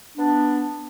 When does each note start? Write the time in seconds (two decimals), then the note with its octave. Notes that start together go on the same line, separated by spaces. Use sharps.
0.18 B3 D4